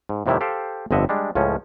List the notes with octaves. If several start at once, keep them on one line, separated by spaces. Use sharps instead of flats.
G#2
F2 A2 C3 D#3 G3 E4
G4 A4 C5 F5 G5
G1 F2 D3 D#5 E5 F#5
G3 G#3 D4
C#2 A2 F3 C#4